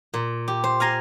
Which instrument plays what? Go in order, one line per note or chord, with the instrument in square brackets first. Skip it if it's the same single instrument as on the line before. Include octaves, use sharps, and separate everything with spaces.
[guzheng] A#2
G4
C5
F5 G#5 A#5 C6